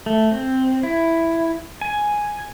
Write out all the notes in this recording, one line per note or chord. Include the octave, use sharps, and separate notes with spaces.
A3
C4
E4
G#5